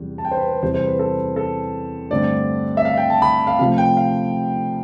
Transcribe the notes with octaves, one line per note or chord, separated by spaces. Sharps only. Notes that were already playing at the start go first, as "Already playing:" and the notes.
Already playing: E2 C3 G3
A5
G5
C5
B4
B4
E2 C3 E3 G3 C4 C5
C5
B4
A4
A4
G2 D3 A3 C4 D5
E5
F5
G5
A5
B5
F5
C3 F3 A3 F5
G5
F5